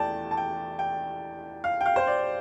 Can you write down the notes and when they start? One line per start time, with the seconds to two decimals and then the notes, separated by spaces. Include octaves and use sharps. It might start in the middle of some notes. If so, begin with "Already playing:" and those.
Already playing: E2 A3 D5 G5 A5
0.31 A5
0.37 G5
0.79 G5
1.64 F5
1.81 G5
1.86 F5
1.96 C5
2.07 D5